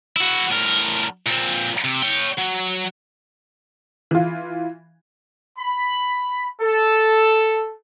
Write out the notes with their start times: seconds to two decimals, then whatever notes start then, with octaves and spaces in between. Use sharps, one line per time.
0.16 E4 F#4
0.51 A2 A#4
1.26 A#2 C4
1.84 C3
2.02 C#5 G5
2.38 F#3
4.11 E3 F4
5.58 B5
6.61 A4